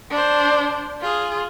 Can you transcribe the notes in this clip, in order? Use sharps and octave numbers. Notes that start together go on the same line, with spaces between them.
D4 C5
F4 G#4